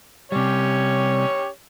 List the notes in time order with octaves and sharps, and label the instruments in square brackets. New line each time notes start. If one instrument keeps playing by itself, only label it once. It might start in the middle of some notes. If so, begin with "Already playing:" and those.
[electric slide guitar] C3 G3 [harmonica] C#4 G4 C#5